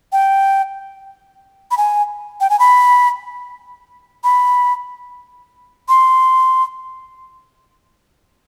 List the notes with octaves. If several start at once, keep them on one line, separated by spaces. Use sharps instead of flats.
G5
B5
G#5
G5
G#5
B5
B5
C6